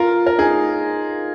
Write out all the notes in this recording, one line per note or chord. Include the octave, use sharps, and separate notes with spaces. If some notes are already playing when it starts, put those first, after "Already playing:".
Already playing: F4 A#4
A#4
D#4 G#4